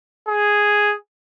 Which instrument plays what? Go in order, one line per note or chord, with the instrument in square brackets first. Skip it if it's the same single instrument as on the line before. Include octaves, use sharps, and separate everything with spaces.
[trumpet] G#4